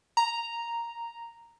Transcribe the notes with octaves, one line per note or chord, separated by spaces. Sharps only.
A#5